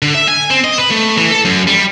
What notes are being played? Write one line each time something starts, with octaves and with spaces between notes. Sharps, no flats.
D3
E5
G#5
C4
D#5
B4
A3
E3
A4
F#2
G3